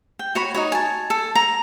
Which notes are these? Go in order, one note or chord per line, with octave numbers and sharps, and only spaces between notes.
G5
F#4 C#5 B5
D#4 F#4 C#5
G#5 A5
A4
A#5